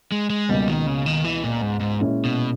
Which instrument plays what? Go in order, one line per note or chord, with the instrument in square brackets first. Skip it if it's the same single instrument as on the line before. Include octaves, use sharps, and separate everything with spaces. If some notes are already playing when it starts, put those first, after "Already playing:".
[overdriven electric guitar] G#3
G#3
[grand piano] C#2 B2 A#3 [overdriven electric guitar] G3
[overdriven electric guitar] D#3
C#3
D#3
E3
A#2
G#2
G#2
[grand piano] A#2 G#3 C#4 E4
[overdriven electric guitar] B2